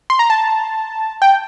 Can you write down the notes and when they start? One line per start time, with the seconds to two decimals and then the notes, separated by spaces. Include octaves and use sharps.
0.10 C6
0.19 A#5
0.30 A5
1.22 G5